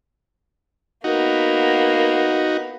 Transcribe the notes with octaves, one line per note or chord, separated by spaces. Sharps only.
A#3 B3 D#4 F#4